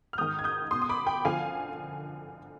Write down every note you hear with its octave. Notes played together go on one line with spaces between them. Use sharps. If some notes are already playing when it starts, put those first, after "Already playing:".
F6
G#2 D#3 D#6 G6
G#6
D#6 G6
B2 C6 D#6
D#6
B5 D6
G5 B5
D3 F3 F5 G#5